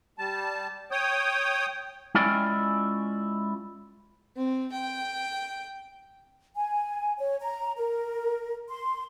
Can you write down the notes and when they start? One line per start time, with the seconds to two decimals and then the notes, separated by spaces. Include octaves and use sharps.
0.18 G3 A5
0.91 C#5 G5 D#6
2.15 G#3 C#4 E4 F4 D5 G5
4.37 C4
4.72 G5
6.56 G#5
7.19 C#5
7.41 A#5
7.77 A#4
8.69 C6